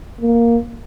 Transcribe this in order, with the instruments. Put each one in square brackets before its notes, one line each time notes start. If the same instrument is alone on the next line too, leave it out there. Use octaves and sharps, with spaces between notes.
[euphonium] A#3